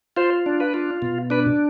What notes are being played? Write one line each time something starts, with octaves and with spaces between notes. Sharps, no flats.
F4 C5
D4
B4
F4
B2
D4 B4